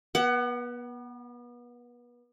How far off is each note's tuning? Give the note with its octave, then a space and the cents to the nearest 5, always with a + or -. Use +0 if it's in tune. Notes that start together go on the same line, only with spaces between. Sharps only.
B3 -30 F#5 +20